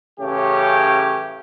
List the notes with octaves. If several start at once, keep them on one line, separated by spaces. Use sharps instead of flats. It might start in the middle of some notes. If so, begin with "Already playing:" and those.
A2 C#3 E3 C#4 G4